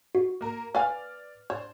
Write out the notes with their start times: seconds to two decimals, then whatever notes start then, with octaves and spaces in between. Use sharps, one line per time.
0.15 F#4
0.41 A#3 A#4 A#5
0.75 B4 D5 F5 G#5 F6
1.50 D4 C5 C#5